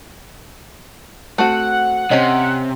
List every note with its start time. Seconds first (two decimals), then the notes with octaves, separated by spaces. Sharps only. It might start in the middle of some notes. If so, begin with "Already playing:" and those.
1.38 A3 C4 F#4 F#5
2.11 C3 C4 C#4 D#5